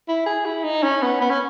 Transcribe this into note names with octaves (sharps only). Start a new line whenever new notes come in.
E4
G#4
E4
D#4
C#4
B3
B3
C#4